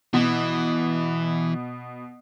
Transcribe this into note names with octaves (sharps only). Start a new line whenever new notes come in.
B2 E3